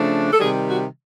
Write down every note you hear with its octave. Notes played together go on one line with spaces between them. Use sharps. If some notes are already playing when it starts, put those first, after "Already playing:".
Already playing: C#3 F3 A3 D4
A4
C3 D#3 G3 G#4
F#4